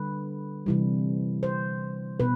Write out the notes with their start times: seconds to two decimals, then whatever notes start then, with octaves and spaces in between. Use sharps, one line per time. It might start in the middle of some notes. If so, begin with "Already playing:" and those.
Already playing: D3 G3 B4
0.66 C3 E3 G3
1.43 C5
2.20 B2 B4